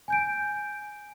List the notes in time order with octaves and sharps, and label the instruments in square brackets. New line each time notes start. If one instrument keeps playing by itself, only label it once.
[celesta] G#5 G6 D7